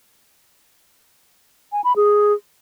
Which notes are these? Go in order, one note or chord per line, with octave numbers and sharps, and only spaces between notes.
G#5
B5
G#4